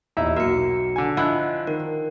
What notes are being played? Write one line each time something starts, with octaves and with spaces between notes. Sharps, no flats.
D#1 E2 D#4 E4 E5
B1 A#3 F#4 E5 C#7 E7
D3 G#5
F3 D4 E4 D#5 F#5 F#6
D#3 A#4